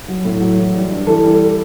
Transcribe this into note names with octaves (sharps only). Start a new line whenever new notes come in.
F#3
A2
F#3
E3
G3
G2
E3 A4
G3